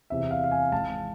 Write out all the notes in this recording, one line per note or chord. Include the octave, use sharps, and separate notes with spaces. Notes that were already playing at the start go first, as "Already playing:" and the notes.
E2 C3 E3 E5
F5
F5
G#5
G#1 G#2 E3 A5